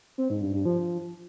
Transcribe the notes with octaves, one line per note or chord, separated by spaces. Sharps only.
C4
G#2
G2
G2
F3